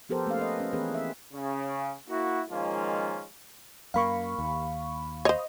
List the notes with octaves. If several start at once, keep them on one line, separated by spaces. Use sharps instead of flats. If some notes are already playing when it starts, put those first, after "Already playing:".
F3 B3 G4 A4 A#4 C5
A3 A#3 C#4 F5
B4 D#5
C#4
E3 B3 C4 G#4 A#4 B4
E5
C#3
A#3 E4 F#4
D#3 F3 G#3 A#3 C#4 F4
F#2 A#3 F5 B5 C#6
D#2
C5 C#5 D#5